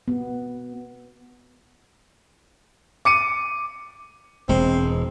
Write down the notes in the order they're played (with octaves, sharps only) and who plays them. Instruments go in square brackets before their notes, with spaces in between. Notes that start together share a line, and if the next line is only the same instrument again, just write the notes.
[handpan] B3
[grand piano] D6 C#7 D#7
[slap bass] E1 G#3 [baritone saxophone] C4